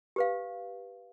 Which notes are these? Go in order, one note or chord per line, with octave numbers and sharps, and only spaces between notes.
G4 B4 F5